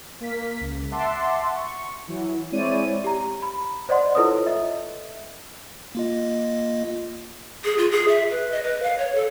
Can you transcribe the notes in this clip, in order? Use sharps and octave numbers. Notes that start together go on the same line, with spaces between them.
A#3 B6
C#2
E5 F#5 A5 C6 D6
C#6
E3 F#3
G#3 C4 E4 C#5 D5 D#7
G4 A#5
B5
C5 D5 D#5 F#5 C6
E4 F4 A4 B4 C#5 D#6
D#5 E5
A#3 F4 D#5
G#4
F4
G#4
E5
B4
D#5
B4
F5
C#5
A4